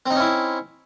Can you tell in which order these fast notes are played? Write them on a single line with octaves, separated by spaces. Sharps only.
C4 D#4 C#4 E4